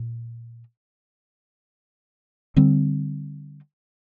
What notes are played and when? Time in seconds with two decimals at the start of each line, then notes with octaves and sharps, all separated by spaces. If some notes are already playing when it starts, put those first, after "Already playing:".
Already playing: A#2
2.56 D3 G3 C4